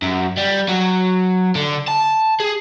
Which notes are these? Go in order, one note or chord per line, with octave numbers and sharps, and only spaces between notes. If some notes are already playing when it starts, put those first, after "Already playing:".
F#2
G3
F#3
D3
A5
G#4